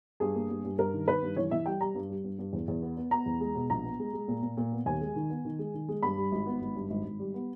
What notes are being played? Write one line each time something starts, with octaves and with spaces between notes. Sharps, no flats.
G2 G#4
A#3
G2
G2
G2 A#4
D#3
D#3 B4
G2
E3 C#5
E3 E5
G3 G5
G3 A#5
G2
G3
G2
G2
E2
E2
B3
B3
B3 A#5
E2
G#3
B2
A#1 A#5
B3
G#3
G#3
A#2
A#2
A#2
B3
D#2 G#5
G#3
D#3
B3
D#3
G#3
D#3
G#3
G2 B5
G3
G#1
B3
G#1
G2
G#1
G#1
G3
B3